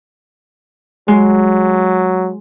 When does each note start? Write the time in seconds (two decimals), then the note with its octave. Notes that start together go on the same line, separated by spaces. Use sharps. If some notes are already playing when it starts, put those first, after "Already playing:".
1.08 F#3 G#3